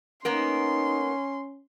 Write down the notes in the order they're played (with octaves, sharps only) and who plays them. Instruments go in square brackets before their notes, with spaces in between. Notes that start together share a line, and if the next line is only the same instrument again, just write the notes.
[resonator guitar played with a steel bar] A#3 B3 A#4 [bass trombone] C#4 [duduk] D#4 [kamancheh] C6